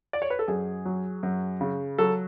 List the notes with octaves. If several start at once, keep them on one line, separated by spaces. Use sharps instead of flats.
D5
C#5
B4
A4
F#2 G#4
F#3
F#2
C#3
F#3 A4